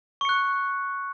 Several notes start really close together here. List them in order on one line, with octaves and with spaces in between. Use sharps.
C#6 C#7 F#6